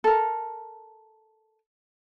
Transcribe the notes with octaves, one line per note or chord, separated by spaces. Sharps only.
A4 A#4